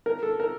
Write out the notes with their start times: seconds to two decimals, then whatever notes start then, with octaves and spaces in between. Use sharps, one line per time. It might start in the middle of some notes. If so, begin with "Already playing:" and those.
0.06 A#4
0.23 A4
0.40 A#4